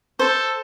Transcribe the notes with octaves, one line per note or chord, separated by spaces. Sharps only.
A4 C5